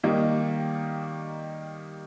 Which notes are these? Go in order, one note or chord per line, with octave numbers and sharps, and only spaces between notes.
D#3 G3 A#3 D#4